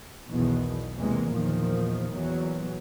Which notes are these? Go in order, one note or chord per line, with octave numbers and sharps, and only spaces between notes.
B1 E2 B2 D#3
E2 C3 E3 G#3 A#3
E2 A#2 D#3 F3
E2 A#2 F#3